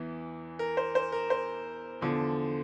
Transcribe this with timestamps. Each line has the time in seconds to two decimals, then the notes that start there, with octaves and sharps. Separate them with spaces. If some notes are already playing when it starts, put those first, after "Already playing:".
Already playing: E2 E3
0.59 A#4
0.77 C5
0.95 C5
1.12 A#4
1.30 C5
2.01 E2 D3 F3